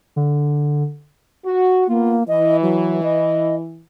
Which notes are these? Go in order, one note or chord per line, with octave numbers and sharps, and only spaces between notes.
D3
F#4
A#3 B3 F4
E3 D#5
F#3
D#5